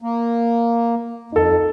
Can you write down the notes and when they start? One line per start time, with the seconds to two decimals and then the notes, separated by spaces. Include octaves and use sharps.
0.02 A#3
1.32 F2 D#4 A4